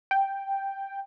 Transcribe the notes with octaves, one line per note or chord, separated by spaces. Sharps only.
G5